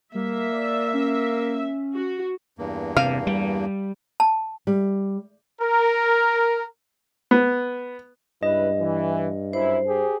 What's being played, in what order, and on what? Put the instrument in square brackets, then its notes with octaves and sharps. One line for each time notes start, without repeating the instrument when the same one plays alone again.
[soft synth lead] G3 [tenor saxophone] A#3 [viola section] E5
[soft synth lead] D5
C#4
[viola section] F#4
[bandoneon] E2 G2 A#3
[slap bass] C3 [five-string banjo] F5
[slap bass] G3
[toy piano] A5
[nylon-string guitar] G3
[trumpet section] A#4
[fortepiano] B3
[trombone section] C#2 E4 B4 [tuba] G2 [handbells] D#5
[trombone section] E3
[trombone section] F#2 E4 [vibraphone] C5
[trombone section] G4 G#4